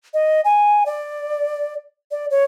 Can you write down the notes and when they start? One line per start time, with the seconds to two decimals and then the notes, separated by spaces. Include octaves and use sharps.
0.13 D#5
0.45 G#5
0.86 D5
2.11 D5
2.30 C#5